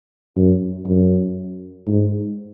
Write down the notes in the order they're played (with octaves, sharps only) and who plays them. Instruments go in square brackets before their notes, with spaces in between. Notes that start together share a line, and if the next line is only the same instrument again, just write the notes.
[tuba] F#2
F#2
G#2